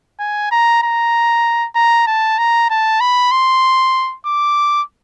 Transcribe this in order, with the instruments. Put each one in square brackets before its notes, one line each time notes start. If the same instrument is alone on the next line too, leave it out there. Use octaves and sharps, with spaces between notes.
[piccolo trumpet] G#5
A#5
A#5
A#5
A5
A#5
A5
B5
C6
D6